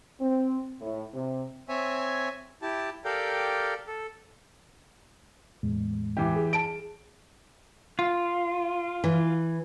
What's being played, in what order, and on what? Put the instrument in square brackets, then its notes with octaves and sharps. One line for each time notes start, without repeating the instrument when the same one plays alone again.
[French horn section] C4
A2
C3
[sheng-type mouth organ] C4 C#5 E5 G#5
E4 G4 A5
G4 A4 A#4 D5 F5 G5
A4
[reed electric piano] E2 A2 G#3
[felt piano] E3 G4
[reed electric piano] G#4
[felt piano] A5 D7
[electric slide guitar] F4
[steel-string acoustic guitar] E3